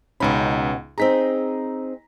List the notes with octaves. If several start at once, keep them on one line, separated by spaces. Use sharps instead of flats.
C#2 B2 C#4 D#4 B5
C4 D#4 G#4 A#5 B6